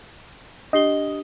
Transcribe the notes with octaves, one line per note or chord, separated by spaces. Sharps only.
D4 G4 D#5 G7